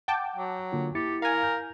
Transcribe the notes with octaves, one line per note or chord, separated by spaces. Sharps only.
F#5 G5 A5 D6
F#3
D3 A#3 F4
E4 G4 A6 C#7
A#4 F5 G#5
G6